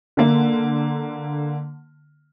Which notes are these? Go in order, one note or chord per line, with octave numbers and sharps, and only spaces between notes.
D3 A#3